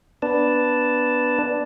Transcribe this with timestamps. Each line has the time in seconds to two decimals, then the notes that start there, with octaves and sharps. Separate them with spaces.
0.22 B3 D4 B4 D5 A5